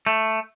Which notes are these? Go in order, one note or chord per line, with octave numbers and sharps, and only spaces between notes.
A3